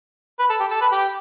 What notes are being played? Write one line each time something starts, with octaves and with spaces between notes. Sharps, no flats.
B4
A4
G4
A4
B4
G4